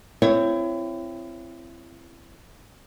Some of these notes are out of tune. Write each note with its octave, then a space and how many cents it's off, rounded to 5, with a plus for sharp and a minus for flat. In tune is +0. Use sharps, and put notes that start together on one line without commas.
C4 +0 E4 +35 C#5 +0